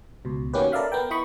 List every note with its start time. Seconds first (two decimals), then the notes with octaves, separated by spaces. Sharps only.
0.25 C#2 B2
0.53 D#3 A#3 C#4 F#4 G4 B4
0.72 A4 A#4 D5 E5 F5 B5
0.92 B3 A#4 G5
1.10 E4 D#5 B5 C#6